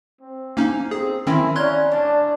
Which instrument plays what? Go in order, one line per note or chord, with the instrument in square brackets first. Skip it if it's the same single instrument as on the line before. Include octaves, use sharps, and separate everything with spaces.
[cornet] C4
[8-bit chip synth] A#3 C#4 D#4
[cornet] C4 [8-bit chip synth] G#4
[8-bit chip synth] D#3 C4 C#4 [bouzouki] A#3 C5 [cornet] E4
[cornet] C#4 [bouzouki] D5 F5 A#5 [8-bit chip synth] C6 F#6 G#6
[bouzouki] A2 A3 [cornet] D4